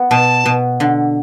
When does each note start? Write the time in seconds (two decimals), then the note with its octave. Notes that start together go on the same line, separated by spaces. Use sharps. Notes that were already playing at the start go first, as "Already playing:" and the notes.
Already playing: B3
0.11 B2 A5
0.45 B2
0.80 D3